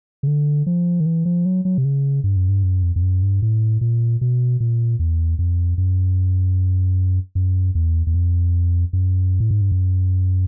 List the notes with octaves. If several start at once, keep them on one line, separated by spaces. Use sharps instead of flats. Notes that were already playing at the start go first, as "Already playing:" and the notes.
C#3
D3
F3
D#3
E3
F3
F#3
F#3
C3
C#3
G2
F#2
G2
F#2
F2
F2
F#2
G2
A2
A#2
B2
A#2
E2
F2
F#2
F#2
E2
E2
F2
F#2
A2
G#2
G2
F#2